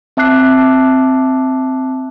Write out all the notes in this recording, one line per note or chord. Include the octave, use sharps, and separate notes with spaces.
C4 E5 A5 D6 F#6 C7